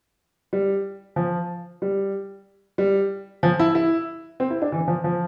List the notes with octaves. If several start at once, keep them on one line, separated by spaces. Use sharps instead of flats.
G3
F3
G3
G3
F3
E4
E4
C4
E4
D4
E3
F3
F3